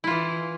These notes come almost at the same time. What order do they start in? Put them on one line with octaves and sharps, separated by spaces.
E4 F4 E3